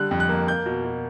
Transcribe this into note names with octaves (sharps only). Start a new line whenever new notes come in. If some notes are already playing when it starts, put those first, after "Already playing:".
Already playing: D3 G3 F#6
F2
F#6
A#3
A#3 G6
B2
B2